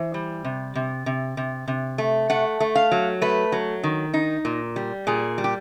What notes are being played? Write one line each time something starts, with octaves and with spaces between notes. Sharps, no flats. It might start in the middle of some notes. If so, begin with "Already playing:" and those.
Already playing: E3 C5
G3
C3
C3
C3
C3
C3
A3
A3 F#5
A3
F5
F#3
A3 B4
F#3
D#3
D#4
A#2
G3
A#2 G#4
G3
G4